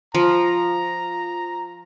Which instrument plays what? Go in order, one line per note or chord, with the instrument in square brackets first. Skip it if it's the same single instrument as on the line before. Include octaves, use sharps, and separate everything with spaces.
[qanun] F3 [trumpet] A#5